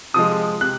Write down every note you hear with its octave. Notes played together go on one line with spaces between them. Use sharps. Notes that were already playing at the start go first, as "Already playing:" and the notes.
C3 F3 G#3 D#6
C3 F#6